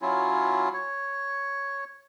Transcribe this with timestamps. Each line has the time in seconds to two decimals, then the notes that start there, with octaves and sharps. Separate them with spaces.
0.02 F#3 C#4 E4 F4
0.74 C#5